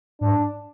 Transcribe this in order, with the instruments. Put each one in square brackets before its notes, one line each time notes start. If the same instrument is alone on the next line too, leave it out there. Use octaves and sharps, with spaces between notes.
[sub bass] G#2 [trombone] D4